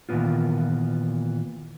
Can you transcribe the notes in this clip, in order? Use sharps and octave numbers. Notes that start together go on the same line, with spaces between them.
A#2 D#3 E3 B3 F4